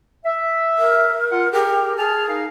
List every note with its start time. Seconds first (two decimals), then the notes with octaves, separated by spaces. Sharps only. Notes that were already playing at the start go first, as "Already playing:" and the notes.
0.25 E5
0.78 A#4
1.31 F4 F#5
1.53 G4 G#4 A#4
1.97 G#4 G#5 A5 F6
2.28 D#4 A#4 F5